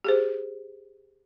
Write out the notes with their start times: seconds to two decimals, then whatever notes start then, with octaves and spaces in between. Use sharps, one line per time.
0.04 G4 G#4 C5